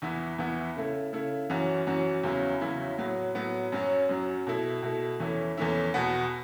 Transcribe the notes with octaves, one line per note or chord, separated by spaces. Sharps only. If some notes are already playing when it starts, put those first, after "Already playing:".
E2 E3 B3 E4
E2 E3 B3 E4
C#3 A3 E4
C#3 A3 E4
F#2 E3 C#4 F#4
F#2 E3 C#4 F#4
E2 C#3 F#3 C#4 E4
E2 C#3 F#3 C#4 E4
A2 F#3 B3
A2 F#3 B3
F#2 F#3 C#4
F#2 F#3 C#4
B2 A3 E4
B2 A3 E4
E2 E3 A3 C#4 E4
E2 E3 A3 C#4 E4
E2 B2 B3